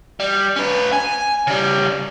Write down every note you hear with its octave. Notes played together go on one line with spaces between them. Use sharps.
G3
C#4 B4
G#5
C#3 G3